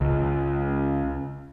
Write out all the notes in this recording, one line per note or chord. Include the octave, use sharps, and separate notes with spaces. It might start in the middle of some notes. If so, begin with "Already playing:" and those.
C#2